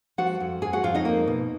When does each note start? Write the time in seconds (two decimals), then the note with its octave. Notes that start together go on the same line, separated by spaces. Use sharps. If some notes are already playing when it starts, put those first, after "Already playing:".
0.18 F3 F#4 F#5
0.40 F2
0.62 F2 G#4 G#5
0.73 F#4 F#5
0.83 F2 F4 F5
0.95 D#4 D#5
1.05 A#3
1.28 B2